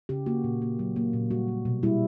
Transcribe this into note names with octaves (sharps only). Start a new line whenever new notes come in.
C#3 G4
A#3 F#4
A#2
A#3
F#3
A#3
A#2
G3 F#4
A#3
B2
G3 E4